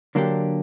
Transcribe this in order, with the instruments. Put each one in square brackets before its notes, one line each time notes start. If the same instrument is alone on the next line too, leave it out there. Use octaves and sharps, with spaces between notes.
[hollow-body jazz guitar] D3 F#3 A#3 D4 G4